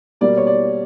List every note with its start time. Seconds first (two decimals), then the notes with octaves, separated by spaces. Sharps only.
0.21 B2 G3 A#3 D5
0.37 C#5
0.47 D5